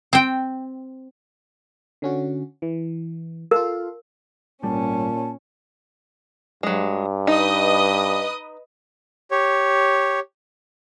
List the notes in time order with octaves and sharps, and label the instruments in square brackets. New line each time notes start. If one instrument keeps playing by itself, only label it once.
[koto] C4 G5
[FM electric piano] D3 C#4 F#4
E3
[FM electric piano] F4 A4 F5 [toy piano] A#4
[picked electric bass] G#1 G3 [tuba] A#2 [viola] C#4 [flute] A5
[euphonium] G2 [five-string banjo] F#3 G#3
[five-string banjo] D#4 [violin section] B4 D#5 D#6
[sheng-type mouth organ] G4 C#5